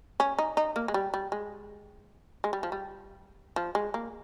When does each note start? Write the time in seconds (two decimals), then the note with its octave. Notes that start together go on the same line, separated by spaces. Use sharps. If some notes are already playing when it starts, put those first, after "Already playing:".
0.20 C#4
0.39 D#4
0.57 D#4
0.76 A#3
0.88 G#3
0.94 G3
1.14 G3
1.32 G#3
2.44 G#3
2.53 G3
2.63 F3
2.72 G3
3.56 F3
3.75 G#3
3.94 A#3